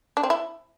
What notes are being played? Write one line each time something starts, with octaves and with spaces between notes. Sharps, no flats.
D4
C4
E4